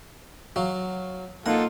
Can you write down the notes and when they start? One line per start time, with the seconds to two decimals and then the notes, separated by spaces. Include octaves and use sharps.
0.56 F#3 F5
1.46 A#3 D#4 F4 A4 F#5